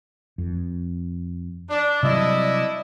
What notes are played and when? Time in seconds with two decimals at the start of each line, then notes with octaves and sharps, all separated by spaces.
0.38 F2
1.70 D4 D5
2.03 C3 F#3 G3 D4 E4 D#5